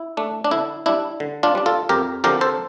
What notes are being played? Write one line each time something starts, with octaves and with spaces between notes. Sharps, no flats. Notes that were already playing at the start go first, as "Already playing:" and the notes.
Already playing: E4
A3 D4
D4
D3 E4
G3 D4 E4
D3
D4 F4
G3 D4
F4 A4
F2 G4 A#4
D3 F3 C4 G4 A#4
A4 C5